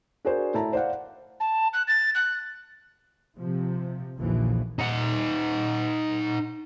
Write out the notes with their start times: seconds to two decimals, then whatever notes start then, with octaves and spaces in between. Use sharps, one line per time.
0.25 D4 F#4 G#4 A#4 C5
0.54 A2 E4 A5 A#5
0.73 C5 D5 F5 F#5
1.40 A5
1.74 F#6
1.88 A6
2.15 F#6
3.38 C3 F3
4.16 A#1 D#2 A#2 D3 E3 F3
4.79 D#4 F#5